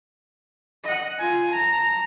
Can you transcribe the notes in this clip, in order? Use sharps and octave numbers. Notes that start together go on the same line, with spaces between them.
D#5 F#5
F4 G#5
A5 A#5